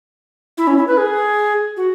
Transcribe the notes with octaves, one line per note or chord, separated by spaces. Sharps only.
E4
C#4
E4
B4
G#4
F#4